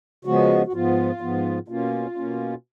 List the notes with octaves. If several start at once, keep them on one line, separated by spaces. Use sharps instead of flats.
C#3 F3 G#3 B3 F#4
F#4
G#2 F3 B3 F4
G#2 F3 B3
B2 A#3 C#4 F4
B2 A#3 C#4